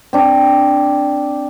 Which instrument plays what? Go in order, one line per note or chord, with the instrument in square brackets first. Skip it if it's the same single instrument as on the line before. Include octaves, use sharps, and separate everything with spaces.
[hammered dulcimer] C4 D4